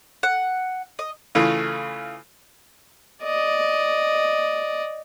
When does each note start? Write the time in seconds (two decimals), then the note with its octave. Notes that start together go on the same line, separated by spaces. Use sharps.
0.23 F#5
0.99 D#5
1.35 C#3 E3 A3 F4
3.23 D5 D#5